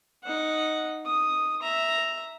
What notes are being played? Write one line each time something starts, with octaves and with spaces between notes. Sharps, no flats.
D#4 F#5
D#6
E5 A#5